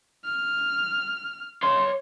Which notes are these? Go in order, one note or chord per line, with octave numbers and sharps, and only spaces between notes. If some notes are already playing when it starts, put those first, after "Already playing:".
F6
C#5 C6